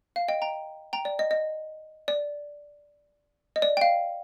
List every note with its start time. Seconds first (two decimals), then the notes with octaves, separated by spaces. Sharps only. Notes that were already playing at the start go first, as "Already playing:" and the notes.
0.16 F5
0.28 D#5 G5
0.42 G5 A#5
0.93 G5 A#5
1.05 D5
1.19 D#5
1.31 D#5
2.08 D5
3.56 D#5
3.62 D5
3.77 G5
3.81 F5